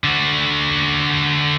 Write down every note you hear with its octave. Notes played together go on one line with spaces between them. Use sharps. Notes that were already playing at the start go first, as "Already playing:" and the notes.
D3 F#4